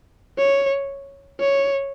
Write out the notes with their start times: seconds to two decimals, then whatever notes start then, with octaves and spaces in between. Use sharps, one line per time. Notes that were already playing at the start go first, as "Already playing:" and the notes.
0.38 C#5
1.40 C#5